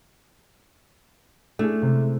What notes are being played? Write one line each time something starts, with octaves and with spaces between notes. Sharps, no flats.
A3 D4 E4 G#4
C3 G#3